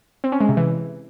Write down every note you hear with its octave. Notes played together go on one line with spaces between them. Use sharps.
C4
C#4
G#3
C3
E3